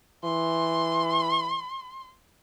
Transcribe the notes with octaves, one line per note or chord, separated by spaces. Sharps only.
E3 C6